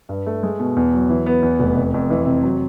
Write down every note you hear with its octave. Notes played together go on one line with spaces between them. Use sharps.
G2
A3
G#3
B2
E2
F#3
E3
B3
E2
F1
C3
F2
E3
C3
F#3